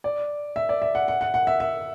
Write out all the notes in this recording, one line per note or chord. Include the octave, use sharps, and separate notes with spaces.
D5
E5
D5
E5
F#5
F#5
F#5
F#5
E5
E5